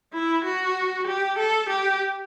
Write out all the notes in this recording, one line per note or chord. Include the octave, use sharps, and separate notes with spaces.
E4
F#4
G4
A4
G4